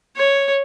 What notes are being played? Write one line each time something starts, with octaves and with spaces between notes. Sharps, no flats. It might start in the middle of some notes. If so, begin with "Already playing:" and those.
C#5